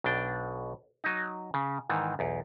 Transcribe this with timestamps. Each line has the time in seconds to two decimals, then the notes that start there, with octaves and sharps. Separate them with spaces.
0.04 B1 B2 D4 G5
1.04 F#3 D#4
1.54 C#3
1.89 G#2 D#3 E3
2.19 B1 E2